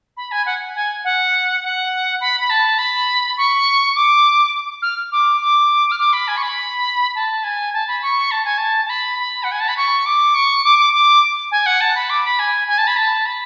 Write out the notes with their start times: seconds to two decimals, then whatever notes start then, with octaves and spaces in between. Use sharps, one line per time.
0.17 B5
0.32 G#5
0.46 F#5
0.75 G#5
1.05 F#5
1.63 F#5
2.21 B5
2.40 B5
2.50 A5
2.79 B5
3.37 C#6
3.95 D6
4.82 F6
5.12 D6
5.41 D6
5.91 F6
5.99 D6
6.13 B5
6.28 G#5
6.37 C#6
6.42 B5
7.15 A5
7.44 G#5
7.73 A5
7.88 B5
8.02 C#6
8.31 A5
8.45 G#5
8.58 A5
8.85 A5
8.90 B5
9.19 B5
9.43 F#5
9.52 G#5
9.60 A5
9.69 B5
9.77 C#6
10.06 D6
10.35 C#6
10.64 D6
10.79 D6
10.94 D6
11.51 G#5
11.66 F#5
11.81 A5
11.95 B5
12.10 D6
12.24 B5
12.39 G#5
12.68 G#5
12.78 A5
12.87 B5
12.97 A5
13.26 B5